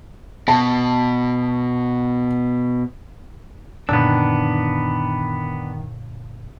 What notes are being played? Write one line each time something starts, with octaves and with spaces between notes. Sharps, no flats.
B2 A5
F#2 A#2 D3 D#3 B3 D4 E6